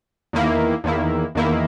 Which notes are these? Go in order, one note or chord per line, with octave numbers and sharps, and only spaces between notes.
E2 D#3 A#3 E4
E2 D#3 A#3 E4
E2 D#3 A#3 E4